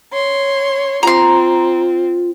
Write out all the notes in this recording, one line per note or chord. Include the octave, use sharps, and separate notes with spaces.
C#5 C6
C4 F4 A#5 C6